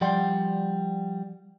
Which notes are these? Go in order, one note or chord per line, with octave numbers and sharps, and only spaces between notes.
F3 G3 D5 F#5 G5 C6